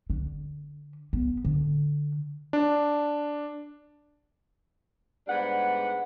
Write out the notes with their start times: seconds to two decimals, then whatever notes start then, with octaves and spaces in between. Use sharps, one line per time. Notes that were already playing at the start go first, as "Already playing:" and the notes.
0.10 D3
1.13 B3
1.45 D3
2.53 D4
5.27 G#2 G3 B3 D4 F#5